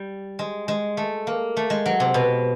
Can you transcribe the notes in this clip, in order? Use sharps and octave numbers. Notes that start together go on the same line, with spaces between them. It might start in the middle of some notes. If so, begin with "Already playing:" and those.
Already playing: G3
G#3
G#3
A3
A#3
A3
G#3
F#3
C3
B2